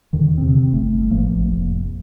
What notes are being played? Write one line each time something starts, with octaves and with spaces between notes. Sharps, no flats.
E2 D3 D#3
C3 C4
G1 A3
A1 F3 A3 A#3
F1